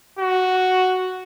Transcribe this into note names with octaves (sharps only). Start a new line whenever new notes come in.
F#4